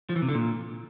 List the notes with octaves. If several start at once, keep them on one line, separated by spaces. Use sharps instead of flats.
F3
E3
C3
D3
A#2